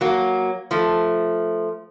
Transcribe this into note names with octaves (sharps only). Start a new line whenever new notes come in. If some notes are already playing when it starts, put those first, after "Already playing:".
F#3 A#3
F3 A3